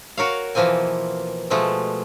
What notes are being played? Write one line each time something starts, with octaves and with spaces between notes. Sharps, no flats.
F#4 A#4 C#5 F5
B2 E3 F3 A#3 C4 G#5
B2 F3 G#3 A3